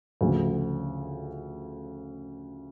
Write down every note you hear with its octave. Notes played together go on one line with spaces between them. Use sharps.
D2 C#3 F3 A3